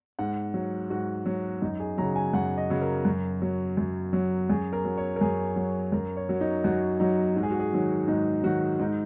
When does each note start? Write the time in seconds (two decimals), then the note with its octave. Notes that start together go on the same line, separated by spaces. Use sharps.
0.19 G#2 F#5
0.54 F#3
0.90 G#2 F#4
1.26 F#3
1.62 F#2 D#4
1.80 G#4
1.98 C#3 F#3 A#5
2.16 G#5
2.33 F#2 F#5
2.57 D#5
2.70 C#3 F#3
2.82 A#4
3.05 F#2
3.42 F#3
3.77 F#2
4.13 F#3
4.50 F#2 G#4
4.73 A#4
4.85 F#3
4.97 C#5
5.16 A#4
5.21 F#2 G#4
5.56 F#3
5.92 F#2 A#4
6.17 C#5
6.29 F#3
6.41 D#4
6.64 F#2 F#4
7.00 F#3 D#4
7.36 G#2 F#4
7.43 G#4
7.51 F#4
7.59 G#4
7.73 D#3 F#3
8.08 G#2 D#4
8.44 D#3 F#3 F#4
8.79 G#2 D#4